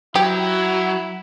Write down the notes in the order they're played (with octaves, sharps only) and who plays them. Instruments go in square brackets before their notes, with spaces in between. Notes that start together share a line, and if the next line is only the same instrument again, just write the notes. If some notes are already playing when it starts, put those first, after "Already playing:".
[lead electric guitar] F#3 [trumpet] E4 [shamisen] G4